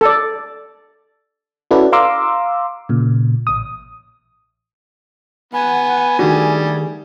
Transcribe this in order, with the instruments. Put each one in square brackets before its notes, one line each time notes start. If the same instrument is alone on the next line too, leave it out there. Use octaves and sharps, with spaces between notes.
[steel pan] A4 D5
[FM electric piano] C#4 E4 F#4 A4 B4 D5
F5 A#5 C6 D6 E6
A#2 C#3
A1 D#6
[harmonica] B3 [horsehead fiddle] F#5 [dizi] G#5
[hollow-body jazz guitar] D#3 D4 F#4 [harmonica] G3 [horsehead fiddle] A3 G#4